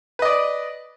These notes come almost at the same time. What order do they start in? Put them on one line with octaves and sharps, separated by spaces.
B4 D#5 D5